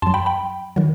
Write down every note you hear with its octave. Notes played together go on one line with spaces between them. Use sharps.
F#2 F#3 A5 C6
G5 B5
G5 B5
D#3 F#3